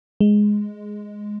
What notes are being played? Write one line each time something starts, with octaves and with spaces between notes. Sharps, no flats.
G#3